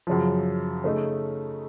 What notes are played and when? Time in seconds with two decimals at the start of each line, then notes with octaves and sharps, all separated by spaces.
0.07 F#2 C#3 F3
0.84 C#3 A3 D#4